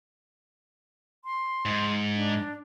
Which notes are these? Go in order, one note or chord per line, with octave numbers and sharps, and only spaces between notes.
C6
G#2
D4